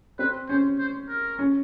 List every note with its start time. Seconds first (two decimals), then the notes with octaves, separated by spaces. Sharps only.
0.19 C4 B4
0.49 C#4 C5
0.79 C5
1.08 A#4
1.39 C#4